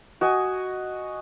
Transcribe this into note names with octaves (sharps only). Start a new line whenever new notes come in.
F#4 D#5 G#5